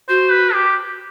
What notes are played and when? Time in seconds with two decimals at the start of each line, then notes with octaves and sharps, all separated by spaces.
0.09 F#4 C5
0.32 B4
0.54 G4